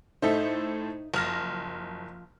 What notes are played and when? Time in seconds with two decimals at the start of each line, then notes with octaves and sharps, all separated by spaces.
0.22 A2 D#4 A4 C5 E5
1.14 F#1 F3 F6 A#6